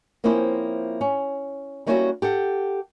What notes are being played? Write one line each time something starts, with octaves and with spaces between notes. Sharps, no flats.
F3 A#3 C4 C#4 E4 C5
C#4
G3 A#3 C#4 D4 E4 F#4
G4 A4 F#5